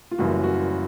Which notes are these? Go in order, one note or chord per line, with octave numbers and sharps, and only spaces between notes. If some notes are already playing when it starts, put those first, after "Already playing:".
F4
F#1 F#2 C#3 E3 G3 F#4
F#4